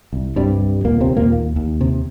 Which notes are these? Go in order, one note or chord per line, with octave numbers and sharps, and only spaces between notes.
C2
G2 C3 G3
C2
D#2 A#2 A#3
C3 C4
D#2
A#2 A#3
D#2
D#2
C3